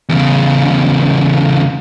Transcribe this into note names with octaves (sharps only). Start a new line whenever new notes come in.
E2 C#3